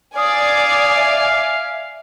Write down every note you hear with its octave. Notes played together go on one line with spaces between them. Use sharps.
D5 F5 G#5 D#6
E5